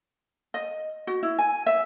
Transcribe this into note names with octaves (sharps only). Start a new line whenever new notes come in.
D#5
F#4
E4
G#5
E5